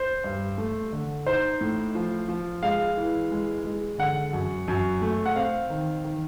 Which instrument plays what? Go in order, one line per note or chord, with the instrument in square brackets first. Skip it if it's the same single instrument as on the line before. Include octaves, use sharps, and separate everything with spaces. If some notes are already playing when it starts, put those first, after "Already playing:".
Already playing: [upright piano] C5
[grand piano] G2
A3
D3
[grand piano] D#4 [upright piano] C5
[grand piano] A2
F3
F3
[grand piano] G#3 [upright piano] F5
[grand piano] E3
G#3
G#3
[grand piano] D3 [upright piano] F#5
[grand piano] F#2
F#2
A3
[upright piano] F#5
[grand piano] C4 [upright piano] F5
[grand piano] D#3
D#3